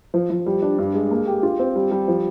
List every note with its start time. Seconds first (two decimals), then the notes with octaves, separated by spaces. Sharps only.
0.14 F3
0.30 F3
0.46 G3
0.62 D4
0.78 G2
0.94 G#3
1.11 A#3
1.26 G4
1.43 F4
1.59 C4
1.76 G3
1.91 G3
2.08 F3